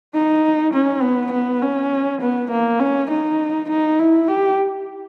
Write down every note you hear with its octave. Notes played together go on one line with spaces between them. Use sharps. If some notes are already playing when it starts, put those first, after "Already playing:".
D#4
C#4
B3
B3
C#4
B3
A#3
C#4
D#4
D#4
E4
G4